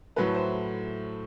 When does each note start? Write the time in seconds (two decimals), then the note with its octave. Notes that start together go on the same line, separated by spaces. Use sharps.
0.16 A2 F#3 A3 B4
0.34 C5